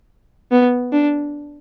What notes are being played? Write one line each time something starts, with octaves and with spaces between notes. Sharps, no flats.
B3
D4